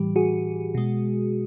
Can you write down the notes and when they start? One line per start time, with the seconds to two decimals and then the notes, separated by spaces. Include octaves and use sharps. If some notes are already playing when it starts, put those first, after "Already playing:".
Already playing: A2 E3 G3 G4
0.16 F#4 G#4
0.75 B2 G#3